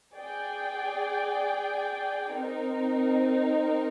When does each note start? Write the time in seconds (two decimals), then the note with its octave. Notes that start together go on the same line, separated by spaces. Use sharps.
0.17 G#4 D5 G5
2.35 C4 D#4 A#4